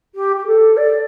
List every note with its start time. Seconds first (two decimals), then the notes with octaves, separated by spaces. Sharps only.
0.14 G4
0.36 G4
0.46 A4
0.76 D5